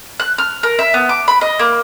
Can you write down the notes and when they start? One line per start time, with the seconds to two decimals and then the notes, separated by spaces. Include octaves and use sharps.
0.20 F#6
0.38 F6
0.63 A#4
0.79 E5
0.94 B3
1.09 D6
1.28 B5
1.41 D#5
1.59 A#3